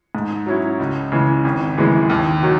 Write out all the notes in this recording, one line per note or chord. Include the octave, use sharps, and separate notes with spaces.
G#2
F#3 C#4 E4
C#2
C#3 E3 G#3
G#1
F#2 C#3 E3 G#3
D#2
D#3 F#3